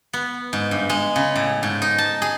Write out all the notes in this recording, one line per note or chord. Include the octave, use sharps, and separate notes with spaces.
B3
G#2
G2
G#3
C#3
A2
G#2
D#4
A5
G#4